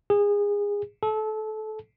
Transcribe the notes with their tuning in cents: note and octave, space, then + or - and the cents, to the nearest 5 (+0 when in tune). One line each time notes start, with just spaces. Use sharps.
G#4 -25
A4 -25